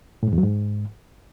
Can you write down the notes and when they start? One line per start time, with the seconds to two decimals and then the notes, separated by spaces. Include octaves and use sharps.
0.23 A2
0.28 G#2
0.33 E2
0.38 F#3
0.43 G#2